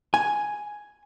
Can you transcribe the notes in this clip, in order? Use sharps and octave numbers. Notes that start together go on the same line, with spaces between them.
G#5